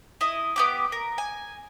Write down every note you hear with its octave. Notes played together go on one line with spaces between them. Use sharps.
E4 D#5
B3 G4 D6
A#4
G#5